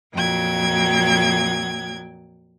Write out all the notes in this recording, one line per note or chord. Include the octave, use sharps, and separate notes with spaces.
F2 A#2 F#3 G5 G#6